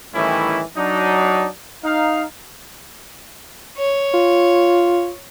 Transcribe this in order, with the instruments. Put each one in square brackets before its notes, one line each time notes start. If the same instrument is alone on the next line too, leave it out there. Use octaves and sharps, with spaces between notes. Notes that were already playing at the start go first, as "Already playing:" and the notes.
[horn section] A2 D#3 E3 G3 C#4 E4
F#3 D4 D#4
D#4 F5
[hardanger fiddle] C#5
[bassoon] F4